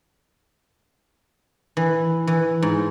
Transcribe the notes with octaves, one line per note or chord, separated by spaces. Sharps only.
E3
E3
G#2